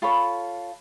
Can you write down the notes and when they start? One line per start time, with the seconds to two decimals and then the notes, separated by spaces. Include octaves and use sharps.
0.02 F4 A4 C#5 B5